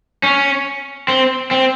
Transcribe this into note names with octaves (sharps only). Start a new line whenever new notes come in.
C#4
C4
C4